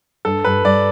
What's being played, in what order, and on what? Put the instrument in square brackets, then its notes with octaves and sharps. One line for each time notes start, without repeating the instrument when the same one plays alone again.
[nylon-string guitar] G2 [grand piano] A4
[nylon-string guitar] G2 [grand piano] B4
[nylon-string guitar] G2 [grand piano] D5